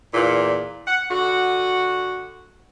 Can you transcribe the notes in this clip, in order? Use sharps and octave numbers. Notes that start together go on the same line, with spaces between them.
E2 A#2
F#5
D3 F#4